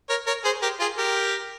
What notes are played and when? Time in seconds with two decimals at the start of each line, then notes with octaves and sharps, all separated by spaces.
0.09 A#4 C#5
0.27 A#4 C#5
0.45 G#4 C5
0.62 G4 A#4
0.80 F4 G#4
0.98 G4 A#4